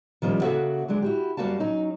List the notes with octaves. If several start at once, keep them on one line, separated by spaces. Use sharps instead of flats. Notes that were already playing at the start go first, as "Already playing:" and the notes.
D#3 F3 G3 C4 C#4
C#3 A#3 F#4 A4 E5 F#5
D3 F#3 G#3 D4
E4 F#4 G4
F#2 G3 A#3 F#4 F5 A5
F#3 C#4 D#4